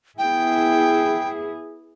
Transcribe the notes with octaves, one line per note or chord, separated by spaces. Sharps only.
B3 E4 G#4 G5